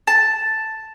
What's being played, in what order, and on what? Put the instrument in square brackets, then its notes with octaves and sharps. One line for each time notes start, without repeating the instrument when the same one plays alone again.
[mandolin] A5